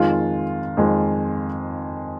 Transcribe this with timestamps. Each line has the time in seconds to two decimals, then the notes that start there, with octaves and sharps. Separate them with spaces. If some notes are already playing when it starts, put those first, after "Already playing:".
Already playing: F2 D#3 G#3 F4
0.77 F2 D#3 G#3